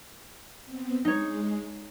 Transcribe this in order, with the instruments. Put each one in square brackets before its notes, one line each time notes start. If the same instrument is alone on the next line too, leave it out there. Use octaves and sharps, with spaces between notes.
[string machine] B3 C4
[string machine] G#3 [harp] D#4 C#5